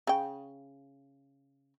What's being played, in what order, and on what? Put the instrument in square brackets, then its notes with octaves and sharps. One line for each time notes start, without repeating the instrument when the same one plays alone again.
[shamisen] C#3 G5